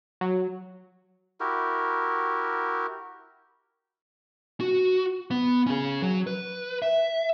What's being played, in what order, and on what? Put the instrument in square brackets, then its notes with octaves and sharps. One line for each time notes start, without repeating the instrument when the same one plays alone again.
[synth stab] F#3
[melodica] E4 F#4 G4 A#4
[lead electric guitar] F#4
B3
C#4 G#4
F#3
B4
E5